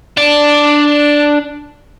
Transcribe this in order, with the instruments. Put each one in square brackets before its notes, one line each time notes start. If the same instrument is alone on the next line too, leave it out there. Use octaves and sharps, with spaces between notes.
[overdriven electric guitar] D4 D5